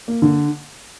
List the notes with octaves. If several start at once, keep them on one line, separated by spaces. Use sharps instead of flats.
A#3
D3